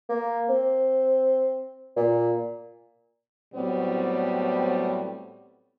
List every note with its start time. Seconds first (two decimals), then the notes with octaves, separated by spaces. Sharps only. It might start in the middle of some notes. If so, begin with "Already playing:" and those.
0.09 A#3
0.49 C4
1.97 A#2
3.54 A2 F#3 G3 B3 C4